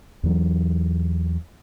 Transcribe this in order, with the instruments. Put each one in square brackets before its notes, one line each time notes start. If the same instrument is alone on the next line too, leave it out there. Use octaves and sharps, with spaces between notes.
[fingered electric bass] E2 E3 F#3